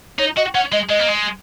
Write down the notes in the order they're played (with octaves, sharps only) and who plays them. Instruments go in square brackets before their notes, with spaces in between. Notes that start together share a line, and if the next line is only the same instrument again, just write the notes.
[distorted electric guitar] D#4 [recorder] C#5
[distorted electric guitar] F#4 [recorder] D#5
[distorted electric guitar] C#4 [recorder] F#5
[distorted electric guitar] G#3 [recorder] D#5
[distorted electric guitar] G#3 [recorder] D#5
[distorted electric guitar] A#3
G#3